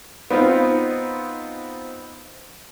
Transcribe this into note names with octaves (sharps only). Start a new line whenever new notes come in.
B3 C4 D#4 F4